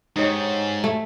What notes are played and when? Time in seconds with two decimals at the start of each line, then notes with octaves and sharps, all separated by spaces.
0.16 G#2 D#4 G4 C#5
0.84 A3